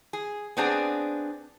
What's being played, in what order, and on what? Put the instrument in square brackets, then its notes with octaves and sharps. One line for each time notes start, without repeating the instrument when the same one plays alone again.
[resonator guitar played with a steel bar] G#4
B3 C4 D4 G#4